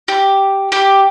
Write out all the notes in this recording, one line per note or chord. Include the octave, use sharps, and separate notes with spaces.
G4
G4